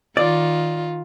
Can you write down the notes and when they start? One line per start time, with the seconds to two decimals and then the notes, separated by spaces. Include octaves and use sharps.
0.17 D#3 F4 D5